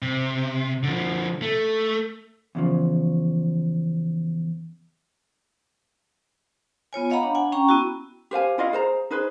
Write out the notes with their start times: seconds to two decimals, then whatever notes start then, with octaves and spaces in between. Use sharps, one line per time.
0.02 C3
0.83 D3 F3
1.42 A3
2.55 E2 C#3 F3
6.93 B3 F4 C#5 G#5
7.10 C#5 D#5 F5 F#5 A#5 B5
7.23 D4
7.35 F#5 G#5
7.52 C#4 G5 A#5 C#6
7.69 B3 E4 F#4
8.31 G4 C5 F5 G#5
8.58 E4 F4 D#5 F5
8.73 G#4 C5 A#5
9.11 D#4 G#4 B4 C5